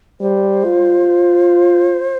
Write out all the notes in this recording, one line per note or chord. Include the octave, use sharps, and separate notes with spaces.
G3 C5
F4